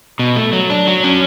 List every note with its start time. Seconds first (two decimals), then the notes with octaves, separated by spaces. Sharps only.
0.19 B2
0.36 A3
0.53 F#3
0.70 D4
0.87 F#3
1.04 C#4